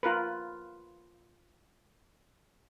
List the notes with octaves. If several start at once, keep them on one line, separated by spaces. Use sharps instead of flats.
F4 A#4 B4